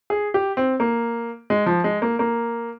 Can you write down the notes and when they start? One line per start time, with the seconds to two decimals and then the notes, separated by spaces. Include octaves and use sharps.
0.10 G#4
0.34 G4
0.57 C4
0.80 A#3
1.50 G#3
1.66 F3
1.84 G#3
2.02 A#3
2.19 A#3